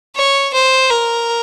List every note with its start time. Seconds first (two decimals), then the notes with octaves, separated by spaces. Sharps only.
0.16 C#5
0.53 C5
0.90 A#4